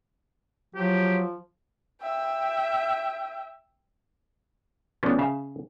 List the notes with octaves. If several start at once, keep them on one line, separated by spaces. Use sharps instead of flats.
F3 F#3 G4
E5 G5
E3 F3 A3 B3 C#4 D4
C#3 E5 F5